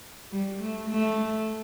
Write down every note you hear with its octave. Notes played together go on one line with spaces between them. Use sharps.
G3
A3
A3